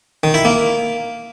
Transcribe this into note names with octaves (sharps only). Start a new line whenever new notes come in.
D#3
E4
A#3